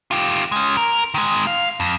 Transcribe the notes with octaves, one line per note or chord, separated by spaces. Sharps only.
F4 G4
G#3 C#4
A#4
D#3 G#3
F5
F2